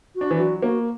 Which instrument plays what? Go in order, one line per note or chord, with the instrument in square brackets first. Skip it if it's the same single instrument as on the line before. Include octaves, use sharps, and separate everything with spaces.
[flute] F#4
[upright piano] D4
E3
[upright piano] F#3 [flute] F#4
[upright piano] A#3 [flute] F#4